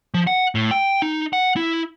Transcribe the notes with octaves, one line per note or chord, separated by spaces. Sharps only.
F3
F#5
A2
G5
D#4
F#5
E4